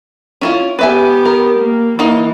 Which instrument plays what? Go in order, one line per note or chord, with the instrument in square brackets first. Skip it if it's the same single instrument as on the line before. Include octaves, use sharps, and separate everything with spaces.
[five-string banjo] C#4 E4 F4
[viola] B3 G4 [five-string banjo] B4 E5 G#5
[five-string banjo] A#4
[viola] A#3
[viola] E3 [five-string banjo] A#3 D#4